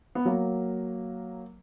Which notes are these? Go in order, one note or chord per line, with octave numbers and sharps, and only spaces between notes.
B3
F#3 A#3